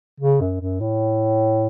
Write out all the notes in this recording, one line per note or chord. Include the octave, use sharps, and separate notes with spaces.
C#3
F#2
F#2
A2